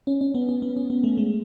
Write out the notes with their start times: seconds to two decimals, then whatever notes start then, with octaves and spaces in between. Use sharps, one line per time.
0.07 C#4
0.21 C#4
0.34 B3
0.49 C#4
0.62 B3
0.77 C#4
0.90 B3
1.04 A3
1.17 G#3